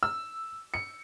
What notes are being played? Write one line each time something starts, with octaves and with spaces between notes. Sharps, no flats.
E6
C#7